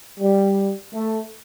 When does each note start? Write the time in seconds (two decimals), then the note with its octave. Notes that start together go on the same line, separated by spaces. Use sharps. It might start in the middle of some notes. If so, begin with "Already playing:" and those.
0.20 G3
0.93 A3